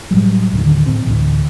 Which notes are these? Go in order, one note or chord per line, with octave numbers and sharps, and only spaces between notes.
A2 F#3 G3
D#2 A2 D3 D#3
A2 C4 C#4
D2 A2 E3